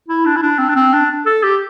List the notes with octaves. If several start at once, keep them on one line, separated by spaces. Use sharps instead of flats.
E4
D4
E4
D4
C4
D4
C4
D4
A4
G4